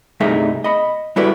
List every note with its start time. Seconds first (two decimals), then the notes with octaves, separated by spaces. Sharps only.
0.20 C2 G2 A3 D#4 G#4 E5
0.64 D#5 B5
1.16 G3 E4 F#4 A4 B4 D5